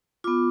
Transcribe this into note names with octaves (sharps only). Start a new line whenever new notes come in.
B3 F4 D6